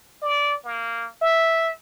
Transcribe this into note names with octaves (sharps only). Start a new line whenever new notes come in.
D5
A#3
E5